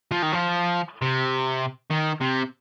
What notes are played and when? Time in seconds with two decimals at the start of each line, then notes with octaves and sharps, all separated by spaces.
0.12 F3
0.23 D#3
0.33 F3
1.02 C3
1.91 D#3
2.21 C3